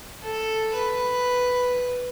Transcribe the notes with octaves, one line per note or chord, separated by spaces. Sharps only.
A4
B4